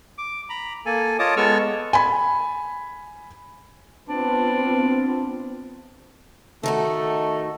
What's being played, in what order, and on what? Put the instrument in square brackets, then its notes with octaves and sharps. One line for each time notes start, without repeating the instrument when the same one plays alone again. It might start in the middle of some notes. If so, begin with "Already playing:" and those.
[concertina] D6
A#5 B5
A#3 A4 G#5
F4 C#5 D#5 A5 D6 D#6
G#3 B3 A4 C#6 E6 F6
[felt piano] G#5 B5
[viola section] B3 C4 F4 [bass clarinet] D4
[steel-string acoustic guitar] D#3 D#4 F#4 [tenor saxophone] A3